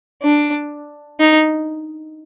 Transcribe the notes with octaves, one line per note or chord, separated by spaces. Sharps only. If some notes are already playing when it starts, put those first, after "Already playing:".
D4
D#4